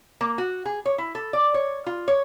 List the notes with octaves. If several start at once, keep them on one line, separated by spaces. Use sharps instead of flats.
A#3
F#4
G#4
C#5
E4
A4
D5
C#5
F4
C#5